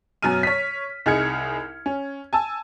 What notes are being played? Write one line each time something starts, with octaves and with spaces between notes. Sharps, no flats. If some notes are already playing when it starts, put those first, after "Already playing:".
F#2 B2 F#3 G#5 F6 D#7
C#5 B6
C2 D#4 G#4 F6 G#6 C#7
C#4
G#5 A5 E6